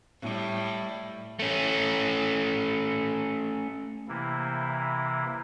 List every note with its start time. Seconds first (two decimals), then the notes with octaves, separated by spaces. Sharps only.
0.21 A2 G3
1.39 A3 C#4
4.08 C3 E3 A#3 E4